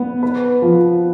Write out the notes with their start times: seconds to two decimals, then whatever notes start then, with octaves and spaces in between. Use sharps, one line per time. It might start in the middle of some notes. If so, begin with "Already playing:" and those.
Already playing: B3
0.23 B4
0.62 F3